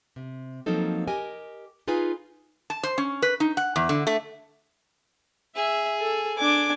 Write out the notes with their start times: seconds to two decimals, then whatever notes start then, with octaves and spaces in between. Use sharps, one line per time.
0.16 C3
0.66 F3 F#3 A#3 C4 D#4 A4
1.07 G4 A#4 D#5 G#5
1.88 D#4 F4 G#4 B4 G#5
2.70 A5
2.83 C5
2.98 C#4
3.22 B4
3.40 D#4
3.57 F#5
3.76 E2
3.89 D3
4.07 A3
5.56 G#4 E5
6.01 A4
6.38 D4 G#5 D6